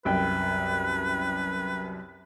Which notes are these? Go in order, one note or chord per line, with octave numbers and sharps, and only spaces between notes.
C2 F#2 B4 G5